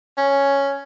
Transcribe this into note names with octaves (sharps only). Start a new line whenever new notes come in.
C#4